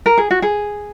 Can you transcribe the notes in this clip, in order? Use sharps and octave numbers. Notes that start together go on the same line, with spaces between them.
A#4
G#4
F#4
G#4